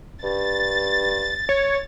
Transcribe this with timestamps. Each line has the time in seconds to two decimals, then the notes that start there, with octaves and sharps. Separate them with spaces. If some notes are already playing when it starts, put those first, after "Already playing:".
0.23 G2 A6
1.49 C#5